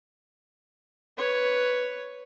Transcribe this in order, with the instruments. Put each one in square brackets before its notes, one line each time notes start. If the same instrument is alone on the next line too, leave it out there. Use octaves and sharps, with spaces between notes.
[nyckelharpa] B4 C#5